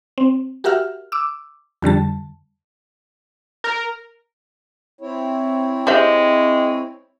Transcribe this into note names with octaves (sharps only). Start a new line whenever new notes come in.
C4
F#4 G4 A#4 E5 F#5 F6
D6 E6
F2 D3 G3 A5
A#4
C4 E4 C#5
G#3 G4 C5 E5